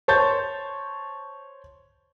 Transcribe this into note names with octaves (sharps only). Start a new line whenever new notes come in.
C5 C#5 A5 G6 A6